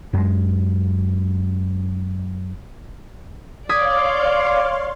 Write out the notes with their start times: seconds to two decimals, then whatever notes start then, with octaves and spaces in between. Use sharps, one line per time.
0.13 F#2 G#3
3.69 C#5 D5 F5 C6 D6 D#6 G#6 B6